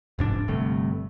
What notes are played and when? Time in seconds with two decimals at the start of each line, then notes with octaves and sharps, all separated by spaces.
0.19 F1 G#2 D4
0.48 G1 G2 C3 A3